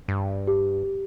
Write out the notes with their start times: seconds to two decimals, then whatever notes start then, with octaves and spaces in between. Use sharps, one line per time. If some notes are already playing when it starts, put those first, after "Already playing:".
0.08 G2
0.47 G4